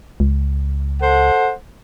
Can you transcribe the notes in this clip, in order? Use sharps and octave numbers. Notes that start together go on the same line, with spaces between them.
C#2
A4 C5 F#5